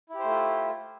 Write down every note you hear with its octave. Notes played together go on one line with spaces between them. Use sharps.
A3 E4 F4 G4 C5